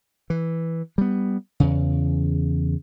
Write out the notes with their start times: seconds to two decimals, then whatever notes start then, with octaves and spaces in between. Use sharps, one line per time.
0.30 E3
0.98 G3 B3
1.60 E2 C#3